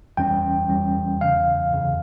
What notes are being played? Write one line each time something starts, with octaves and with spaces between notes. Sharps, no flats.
E2 E3 G3 C#4 G5
E2 E3 G3 C#4
E2 C#3 E3 F5
E2 C#3 E3